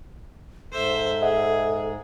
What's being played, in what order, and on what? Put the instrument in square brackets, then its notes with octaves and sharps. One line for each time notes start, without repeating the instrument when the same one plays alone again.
[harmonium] G#2 [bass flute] A4 [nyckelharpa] C5 E5
[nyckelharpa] G#4 [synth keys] D#5 E5 F#5